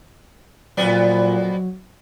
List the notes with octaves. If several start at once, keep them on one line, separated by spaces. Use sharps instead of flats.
F2 A#2 F#3 B3 D5